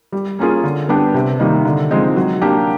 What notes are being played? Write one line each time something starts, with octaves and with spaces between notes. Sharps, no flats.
G3
A#3 C#4 F4 G#4
D3
G3 B3 D4 G4
C3
D#3 G3 A#3 D#4
D3
F3 G#3 C4 D#4
F#3
A#3 D4 G4